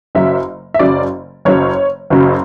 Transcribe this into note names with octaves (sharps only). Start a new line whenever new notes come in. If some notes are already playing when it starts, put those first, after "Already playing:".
F#1 F#2 C#3 F#3 E5
E5
F#1 F#2 C#3 F#3 D5
F#1 F#2 C#3 F#3 C#5
F#1 F#2 C#3 F#3